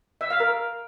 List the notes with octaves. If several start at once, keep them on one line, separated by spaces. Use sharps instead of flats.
E5
F5
A#4